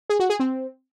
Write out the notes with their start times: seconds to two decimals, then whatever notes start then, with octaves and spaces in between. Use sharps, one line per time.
0.10 G#4
0.20 F#4
0.30 G#4
0.40 C4